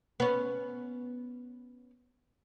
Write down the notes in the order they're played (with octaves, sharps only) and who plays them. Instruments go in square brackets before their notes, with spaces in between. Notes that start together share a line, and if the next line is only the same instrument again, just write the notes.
[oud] B3 C#4